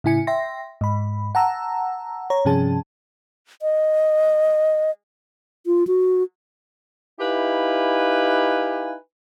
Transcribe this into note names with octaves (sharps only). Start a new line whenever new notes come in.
A2 C#3 E4 G#5 C#7
E5 G5 C6 A#6
G#2 B5
F#5 A5 A#5 E6
C#5 A#5
G2 C3 F3 C#4 G#4 A5
D#5
F4
F#4
D#4 E4 G4 B4 F5 G#5